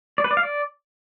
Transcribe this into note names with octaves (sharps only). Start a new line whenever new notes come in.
D5
B4
D5
F5
D5